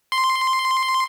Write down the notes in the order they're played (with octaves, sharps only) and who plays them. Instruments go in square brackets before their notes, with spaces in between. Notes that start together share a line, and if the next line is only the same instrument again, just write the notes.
[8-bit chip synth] C6